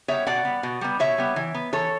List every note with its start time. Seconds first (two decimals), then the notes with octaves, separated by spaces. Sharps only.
0.08 G3 B3 C#5 E5
0.27 B2 D5 F#5
0.45 G3 B3
0.63 B2
0.81 G3 B3
0.99 B2 C#5 E5
1.18 G3 B3
1.36 E3
1.54 B3
1.73 E3 A4 C#5